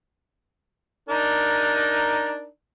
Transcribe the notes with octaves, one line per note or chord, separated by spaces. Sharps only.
D4 D#4 A#4